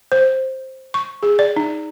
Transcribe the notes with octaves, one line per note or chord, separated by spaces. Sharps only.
C5
C#6
G#4
D5
D#4